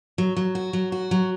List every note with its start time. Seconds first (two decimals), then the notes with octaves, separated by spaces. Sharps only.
0.18 F#3
0.36 F#3
0.55 F#4
0.73 F#3
0.92 F#4
1.11 F#3